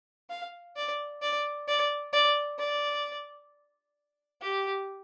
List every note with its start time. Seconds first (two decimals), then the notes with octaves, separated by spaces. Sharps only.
0.30 F5
0.76 D5
1.22 D5
1.68 D5
2.13 D5
2.59 D5
4.41 G4